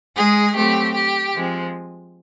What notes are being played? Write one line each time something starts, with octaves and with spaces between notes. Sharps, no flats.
G#3 G#4
F#3 A3 C4 G4
G4
F3 G#3 C4